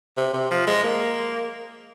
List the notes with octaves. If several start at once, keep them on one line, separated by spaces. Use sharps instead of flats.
C3
C3
F3
G#3
A#3